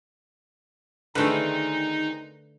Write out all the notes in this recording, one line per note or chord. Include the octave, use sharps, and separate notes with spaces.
D3 D#3 A3 C4 D#4 G#4 B4